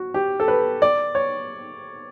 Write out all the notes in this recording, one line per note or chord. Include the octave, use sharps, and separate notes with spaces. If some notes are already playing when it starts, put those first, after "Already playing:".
Already playing: F#4
G4
A4
B4
D5
C#5